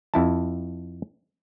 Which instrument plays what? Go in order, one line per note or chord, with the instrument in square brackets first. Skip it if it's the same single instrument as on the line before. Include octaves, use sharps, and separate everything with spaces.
[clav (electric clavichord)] F2 E4 A5